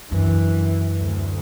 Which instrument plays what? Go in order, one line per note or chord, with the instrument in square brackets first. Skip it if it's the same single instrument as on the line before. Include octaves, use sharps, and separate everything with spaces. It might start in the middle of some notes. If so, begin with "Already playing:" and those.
[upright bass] F#2 D4 [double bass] E3
[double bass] D2